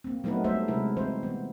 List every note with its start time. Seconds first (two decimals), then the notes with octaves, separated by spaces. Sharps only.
0.04 A#3 C4
0.24 F#3 A3 B3 D#4 A#4 B4
0.44 G3 A3 B3 C5 E5
0.68 C3 G#3 E4 A#4
0.96 E3 C4 C5
1.23 E3 B3